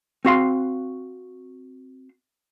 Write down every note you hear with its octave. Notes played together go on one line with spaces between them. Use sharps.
C4 F#4 F5 C6